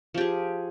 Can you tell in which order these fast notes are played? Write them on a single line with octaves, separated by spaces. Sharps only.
F3 G4 G#4